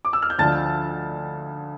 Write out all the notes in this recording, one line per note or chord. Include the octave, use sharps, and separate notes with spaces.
D6
E6
F6
G6
D2 D3 F3 A5 A6